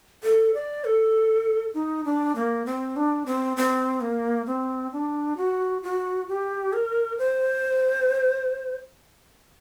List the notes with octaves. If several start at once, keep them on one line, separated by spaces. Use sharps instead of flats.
A4
D5
A4
D#4
D4
A#3
C4
D4
C4
C4
A#3
C4
D4
F#4
F#4
G4
A#4
C5